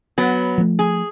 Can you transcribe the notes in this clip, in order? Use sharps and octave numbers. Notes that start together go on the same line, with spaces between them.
F#3 B3
F3 A3
G#4